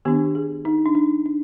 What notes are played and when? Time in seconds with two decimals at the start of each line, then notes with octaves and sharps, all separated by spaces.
0.05 D#3 B3 D4 G4
0.35 G#4
0.65 D#4
0.86 D4
0.95 D#4
1.26 D4